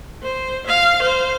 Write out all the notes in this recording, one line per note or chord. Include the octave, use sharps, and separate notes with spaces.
C5
F5
C5